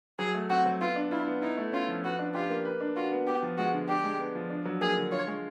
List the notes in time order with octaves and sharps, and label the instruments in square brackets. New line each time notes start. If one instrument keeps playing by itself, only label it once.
[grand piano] F#3 [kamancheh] G#4
[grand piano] A3
[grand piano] C4 [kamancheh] F#4
[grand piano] F#3
[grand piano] B3 [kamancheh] F4
[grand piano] D4
[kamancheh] E4 [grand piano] F4
[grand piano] B3
[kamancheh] D#4 [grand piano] E4
[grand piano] A3
[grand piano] C#4 [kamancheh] F4
[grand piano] F3
[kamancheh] F#4 [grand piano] B4
[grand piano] D4
[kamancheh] F4 [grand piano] G4
[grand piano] A#3
B4
D4
[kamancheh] F4 [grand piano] F#4
[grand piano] B3
[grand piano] B3 [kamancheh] G4
[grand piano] F3
[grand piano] G#3 [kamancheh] F#4
[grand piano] D3
[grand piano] D4 [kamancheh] G4
[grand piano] G#3
B3
F3
D4
F#3
[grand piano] A#3 [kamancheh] G#4
[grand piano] D3
[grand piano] F4 [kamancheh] C#5
[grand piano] G#3